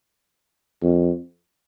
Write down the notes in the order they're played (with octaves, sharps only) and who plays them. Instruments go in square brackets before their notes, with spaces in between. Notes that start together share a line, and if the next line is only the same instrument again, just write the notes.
[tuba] F2